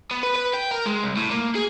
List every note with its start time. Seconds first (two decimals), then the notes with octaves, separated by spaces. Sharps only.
0.11 B3
0.23 B4
0.36 B4
0.54 G5
0.71 A#4
0.86 G#3
1.04 C2
1.17 A2
1.31 A#3
1.55 G#4